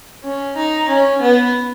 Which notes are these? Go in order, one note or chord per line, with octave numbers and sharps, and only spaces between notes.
C#4
D#4
C#4
B3